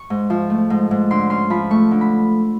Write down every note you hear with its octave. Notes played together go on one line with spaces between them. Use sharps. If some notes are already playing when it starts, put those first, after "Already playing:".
Already playing: C#6
G#2
F3
A3
G#2
G#2
D3 C6
C#4 C6
F3 B5
A3 C#6
D3
B5